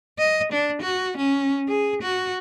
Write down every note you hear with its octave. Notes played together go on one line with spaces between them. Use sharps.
D#5
D4
F#4
C#4
G#4
F#4